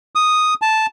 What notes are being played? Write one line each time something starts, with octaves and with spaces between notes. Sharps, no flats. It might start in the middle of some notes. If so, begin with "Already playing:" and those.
D#6
A5